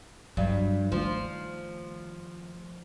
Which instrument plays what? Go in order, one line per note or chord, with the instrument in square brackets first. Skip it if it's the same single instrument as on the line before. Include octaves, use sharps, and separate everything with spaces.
[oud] G2 [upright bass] F#3
[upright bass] D#3 A3 [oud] F3